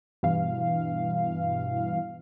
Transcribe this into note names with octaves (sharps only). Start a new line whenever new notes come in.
G2 B2 E3 F5